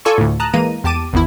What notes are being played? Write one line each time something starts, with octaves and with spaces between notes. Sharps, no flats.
F4 A4 D5 G#5 A5 C#6
D2 A2
A5 A#5 D#6 F#6
E3 G#3 A#3 A#5 D#7
E2 G4 A5 D6 D#7
G#1 E2 E4